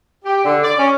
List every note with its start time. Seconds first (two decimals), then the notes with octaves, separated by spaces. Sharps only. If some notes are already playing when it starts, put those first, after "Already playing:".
0.25 G4
0.44 D3
0.63 D5
0.78 C#4